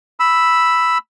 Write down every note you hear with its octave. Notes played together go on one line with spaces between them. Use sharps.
B5 E6